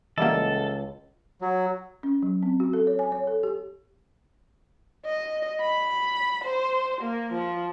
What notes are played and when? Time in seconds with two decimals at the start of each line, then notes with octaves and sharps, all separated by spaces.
0.18 C#2 E3 G3 A#3 A4 D#5 E5 F#5
1.41 F#3
2.03 C#4
2.23 F#3
2.43 C4
2.60 F#4
2.73 A4
2.87 C#5
2.99 G#5
3.12 C#5
3.27 A4
3.43 G4
5.05 D#5
5.61 B5
6.44 C5
7.01 A#3
7.32 F3